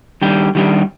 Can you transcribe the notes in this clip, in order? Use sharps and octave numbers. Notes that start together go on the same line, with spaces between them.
D#3 G3 D4 G4
D#3 G3 D4 G4